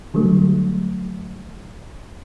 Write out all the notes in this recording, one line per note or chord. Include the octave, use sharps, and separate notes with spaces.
D3 F#3 G3 A3